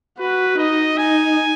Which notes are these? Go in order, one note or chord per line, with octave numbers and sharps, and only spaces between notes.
F#4 B4
D#4 D#5
D#4 G#5